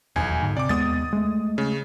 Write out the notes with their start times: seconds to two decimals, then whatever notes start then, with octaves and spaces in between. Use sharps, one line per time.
0.16 D#1 B1 E2 G#5
0.43 G#2 D3
0.57 C3 D5 D6
0.69 D#2 G#3 B3 D#6 A6
1.13 G#3 A3
1.58 C#3